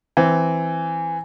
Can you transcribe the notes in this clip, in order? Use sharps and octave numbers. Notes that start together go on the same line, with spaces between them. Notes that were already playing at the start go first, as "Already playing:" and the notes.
E3 C4